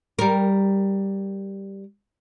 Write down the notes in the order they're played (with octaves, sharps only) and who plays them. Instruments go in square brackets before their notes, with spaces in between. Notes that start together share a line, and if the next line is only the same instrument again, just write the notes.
[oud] G3 A#4